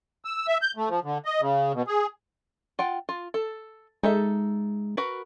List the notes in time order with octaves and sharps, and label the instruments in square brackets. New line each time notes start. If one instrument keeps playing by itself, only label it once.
[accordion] E6
E5
G6
A3
F3
D3
D#5
C#3
B2
G#4
[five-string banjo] F4 F#5 G5
F4
A4
[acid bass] G#3 [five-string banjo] D#4 A4 E5
[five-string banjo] F#4 A#4 B4